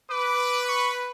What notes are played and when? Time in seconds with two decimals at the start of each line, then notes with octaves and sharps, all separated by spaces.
0.11 B4 D6
0.69 C#6